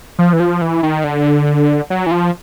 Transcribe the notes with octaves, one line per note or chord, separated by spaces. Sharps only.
F3
E3
F3
E3
D#3
D3
F#3
E3
F3